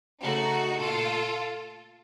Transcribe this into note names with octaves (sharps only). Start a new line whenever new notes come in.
C#3 A3 D#4 F#4
A#2 A3 F4 A4